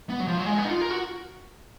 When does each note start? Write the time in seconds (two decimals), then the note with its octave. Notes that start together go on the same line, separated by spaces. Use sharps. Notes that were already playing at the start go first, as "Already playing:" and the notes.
0.10 B3
0.20 F#3
0.28 F3
0.38 F#3
0.46 G#3
0.58 B3
0.65 D#4
0.71 F4
0.82 A#4
0.91 F#4